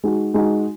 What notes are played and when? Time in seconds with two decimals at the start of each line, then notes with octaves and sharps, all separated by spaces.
0.04 G#3 D#4 F#4
0.34 G#3 D#4 F#4